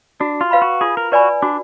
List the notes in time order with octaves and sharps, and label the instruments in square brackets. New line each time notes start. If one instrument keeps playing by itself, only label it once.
[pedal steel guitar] D4 [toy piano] F#4
[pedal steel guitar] F4
[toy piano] B4 F5 B5
[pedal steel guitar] F#4
[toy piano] F4 [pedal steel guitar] G#4
[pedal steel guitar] A#4
[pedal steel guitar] F#4 [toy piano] B4 D5 G#5 B5
[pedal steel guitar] D4 [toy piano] F#4